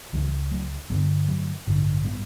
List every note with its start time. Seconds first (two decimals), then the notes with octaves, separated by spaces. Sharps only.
0.13 C#2 C#3 E3 G3
0.51 F#3 A3
0.90 A1 G2 D3 G3 B3
1.28 F#3 A3
1.67 A1 G2 D3
2.05 G3 B3